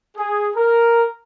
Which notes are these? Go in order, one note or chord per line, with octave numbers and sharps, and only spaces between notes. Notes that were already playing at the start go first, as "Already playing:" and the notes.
G#4
A#4